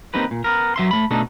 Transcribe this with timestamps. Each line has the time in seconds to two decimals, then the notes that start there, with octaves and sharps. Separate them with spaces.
0.14 A#3 C4 D#4 G4 B4
0.31 A#2
0.44 B3 A#4
0.76 F#3 E5 C6
0.91 A3 B5
1.11 B2 A3 D4 D#4 A4